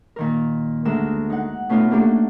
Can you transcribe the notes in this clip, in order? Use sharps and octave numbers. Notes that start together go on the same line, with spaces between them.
A#2 D#3 A#4
D2 G#3 A#4 E6
D#4 F#5
B2 A3 C#4 D#4 F4
A3 A#3 D4 F#4 G4 A4